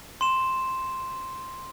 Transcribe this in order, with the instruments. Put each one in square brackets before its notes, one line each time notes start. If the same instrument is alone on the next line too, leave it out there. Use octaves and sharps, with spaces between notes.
[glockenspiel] C6 E7